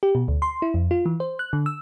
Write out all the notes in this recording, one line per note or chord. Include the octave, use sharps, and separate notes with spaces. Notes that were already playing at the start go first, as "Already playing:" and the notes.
G4
B2
D2
C6
E4
F2
F4
E3
C5
F#6
D3
E6